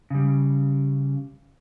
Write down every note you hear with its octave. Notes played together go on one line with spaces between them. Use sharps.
C#3 G3